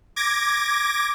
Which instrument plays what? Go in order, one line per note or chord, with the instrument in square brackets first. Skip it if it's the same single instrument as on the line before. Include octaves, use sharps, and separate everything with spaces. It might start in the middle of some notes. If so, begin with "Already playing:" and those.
[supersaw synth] D6 G#6 A#6